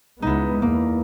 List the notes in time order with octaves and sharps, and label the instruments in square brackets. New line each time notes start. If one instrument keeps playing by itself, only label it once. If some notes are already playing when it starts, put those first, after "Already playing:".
[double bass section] C#2 G#3 B3 [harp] D#4 E4
[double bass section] E2 [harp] A#3